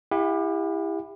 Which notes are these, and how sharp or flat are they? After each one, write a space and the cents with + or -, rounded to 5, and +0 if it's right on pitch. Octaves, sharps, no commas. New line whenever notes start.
E4 +0 G4 +30 F#5 -40